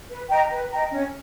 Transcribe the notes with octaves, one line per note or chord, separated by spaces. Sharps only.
B4
D#5 G5 A#5
B4
D#5 G5 A#5
C#4